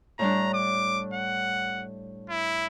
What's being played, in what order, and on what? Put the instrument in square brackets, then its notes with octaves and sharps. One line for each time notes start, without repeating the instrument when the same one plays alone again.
[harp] A2 G3 D4 [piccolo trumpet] A#5
[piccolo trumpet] D6
F#5
E4